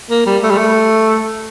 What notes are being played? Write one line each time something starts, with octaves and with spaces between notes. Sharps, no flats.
A#3
G3
A3
G3
A3